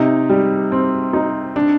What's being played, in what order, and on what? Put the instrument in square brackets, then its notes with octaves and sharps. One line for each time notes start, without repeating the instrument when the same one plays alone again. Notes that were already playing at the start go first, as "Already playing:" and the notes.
Already playing: [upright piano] C3 [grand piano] D#4
[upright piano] G3
C4
D#4
[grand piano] D4